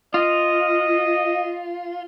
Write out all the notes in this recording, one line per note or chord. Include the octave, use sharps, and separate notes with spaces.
F4 D#5